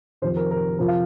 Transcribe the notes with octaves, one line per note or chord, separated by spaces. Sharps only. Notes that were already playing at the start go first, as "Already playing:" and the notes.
F1 F2 C3 D#3 C5
A#4
A#4
F2 C3 F3 A#4
F5